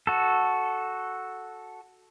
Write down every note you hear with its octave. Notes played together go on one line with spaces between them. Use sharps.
F#4 A4